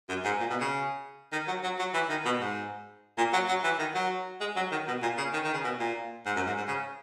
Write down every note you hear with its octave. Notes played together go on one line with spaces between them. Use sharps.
F#2
G#2
A#2
B2
C#3
D#3
F#3
F#3
F#3
E3
D#3
B2
G#2
A#2
F#3
F#3
E3
D#3
F#3
G#3
F#3
D#3
B2
A#2
C#3
D#3
D#3
C#3
B2
A#2
G#2
F#2
G#2
G#2
C#3